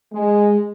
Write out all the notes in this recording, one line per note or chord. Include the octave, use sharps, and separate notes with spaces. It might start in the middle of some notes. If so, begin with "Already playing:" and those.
G#3